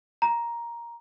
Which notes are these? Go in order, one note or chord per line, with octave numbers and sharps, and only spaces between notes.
A#5